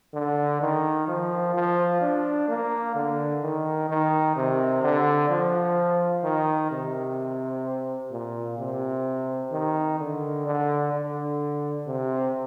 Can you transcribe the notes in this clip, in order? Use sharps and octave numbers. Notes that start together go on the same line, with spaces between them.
D3
D#3
F3
F3
D4
A#3
D3
D#3
D#3
C3
D3
F3
D#3
C3
A#2
C3
D#3
D3
D3
D3
C3